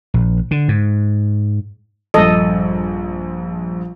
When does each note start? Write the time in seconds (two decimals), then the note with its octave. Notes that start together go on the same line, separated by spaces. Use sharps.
0.14 A#1
0.51 D3
0.68 G#2
2.14 A#1 G2 A4 D#5